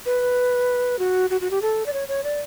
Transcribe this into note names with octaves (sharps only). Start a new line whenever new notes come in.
B4
F#4
F#4
F#4
G4
A4
D5
C#5
C#5
D5